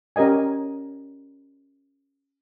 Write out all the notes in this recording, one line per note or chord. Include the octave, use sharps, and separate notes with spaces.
C#4 G4 A#4 D#5 G#5